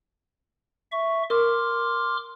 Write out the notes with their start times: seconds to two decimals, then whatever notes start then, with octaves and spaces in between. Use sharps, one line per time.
0.92 E5 C#6
1.30 A#4 C6 D6 F6